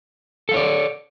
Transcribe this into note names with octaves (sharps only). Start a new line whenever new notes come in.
A4 C#5 D5 F5